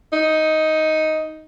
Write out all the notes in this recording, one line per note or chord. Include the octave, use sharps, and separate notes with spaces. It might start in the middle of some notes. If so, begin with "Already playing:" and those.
D#4